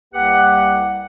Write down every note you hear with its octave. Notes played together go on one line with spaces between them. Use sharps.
C2 A#3 G4 B4 F#5